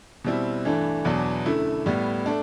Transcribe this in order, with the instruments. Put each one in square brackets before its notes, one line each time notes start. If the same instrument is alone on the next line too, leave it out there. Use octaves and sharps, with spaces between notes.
[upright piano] B2 G3 C4 E4
G2 E3 A3 D4
E2 B2 F#3 B3 D4
F#2 D3 A3 E4
A2 G3 B3
A3 D4